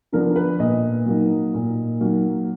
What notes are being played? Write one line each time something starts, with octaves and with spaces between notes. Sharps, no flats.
D3 F3 B3 D4 A#4
B4
A#2 D#5
F#3 A#3 D#4
A#2
F#3 A#3 D#4